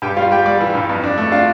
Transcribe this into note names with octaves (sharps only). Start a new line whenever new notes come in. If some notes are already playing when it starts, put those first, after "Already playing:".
G2 G4 G5
G3 F4 F5
G3 G4 G5
G3 D5 D6
E3
G2
F2
D4
A3
D4 F4 F5